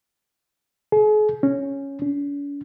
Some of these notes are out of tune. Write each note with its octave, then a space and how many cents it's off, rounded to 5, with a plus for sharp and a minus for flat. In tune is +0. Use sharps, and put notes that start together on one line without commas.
G#4 +40
C#4 -5
C#4 +45